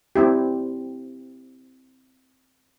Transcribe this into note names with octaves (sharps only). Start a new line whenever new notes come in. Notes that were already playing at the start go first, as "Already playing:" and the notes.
C4 E4 G4